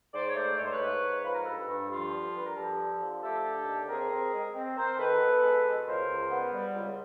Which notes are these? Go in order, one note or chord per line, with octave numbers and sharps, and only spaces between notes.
G#2 C5 D5
C#5
A3 C5 D5
G#2 C#5
C5
B4 C#5
G#2
G#2
F3 B4
A#4
G2 A4 B4
G2
F3 F4 G4
D3
G2 B4
A#4
F3 G4 A4
D3
F3
A3 G4 A4
D3
D#2
C4 G#4 A#4
C4
G#3
C4
C4 A#4 C5
D#3 A4 B4
B3
G#3
B2
C#2 A#4 C5
C#2
B3
G3
C#2